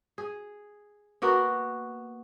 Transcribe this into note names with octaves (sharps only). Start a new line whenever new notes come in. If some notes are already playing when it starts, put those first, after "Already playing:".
G#4
A#3 B3 F#4 A#4